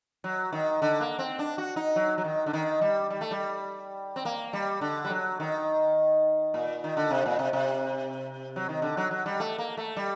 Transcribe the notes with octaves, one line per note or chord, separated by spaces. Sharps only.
F#3
D#3
D3
A#3
C4
D4
F#4
D#4
F#3
F#3
D#3
D3
D#3
G3
G3
A3
G3
C4
A#3
G3
D3
G3
F#3
D#3
A#2
D#3
D3
C3
A#2
C3
C3
F#3
D#3
D3
F#3
F#3
G3
A3
A#3
A3
G3